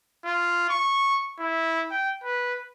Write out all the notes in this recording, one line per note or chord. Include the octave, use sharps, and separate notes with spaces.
F4
C#6
E4
G5
B4